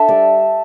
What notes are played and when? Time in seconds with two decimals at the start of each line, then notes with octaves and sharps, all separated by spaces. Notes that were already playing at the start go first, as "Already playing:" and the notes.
Already playing: D4 A4 E5
0.08 G3 D5